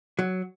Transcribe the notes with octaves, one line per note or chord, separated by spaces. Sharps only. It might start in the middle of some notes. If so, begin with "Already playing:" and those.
F#3